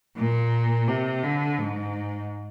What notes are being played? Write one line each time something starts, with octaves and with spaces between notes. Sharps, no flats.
A#2
C3
D3
G#2